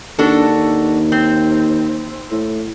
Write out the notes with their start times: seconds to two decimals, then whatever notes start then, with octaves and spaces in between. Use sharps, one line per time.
0.19 D#2 D4 F#4 A4
1.12 C4
2.31 A2